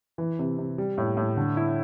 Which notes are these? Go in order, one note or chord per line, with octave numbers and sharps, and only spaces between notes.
E3
C3
C3
G3
A2
A2
D3
E4